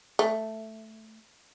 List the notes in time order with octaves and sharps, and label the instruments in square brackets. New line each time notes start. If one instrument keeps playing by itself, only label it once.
[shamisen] A3